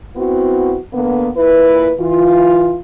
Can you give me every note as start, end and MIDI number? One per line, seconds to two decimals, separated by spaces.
0.16 0.78 59
0.16 0.78 60
0.16 0.78 64
0.16 0.78 66
0.93 1.30 50
0.93 1.30 58
0.93 1.30 59
1.36 1.92 46
1.36 1.92 64
1.36 1.92 71
1.99 2.78 52
1.99 2.78 65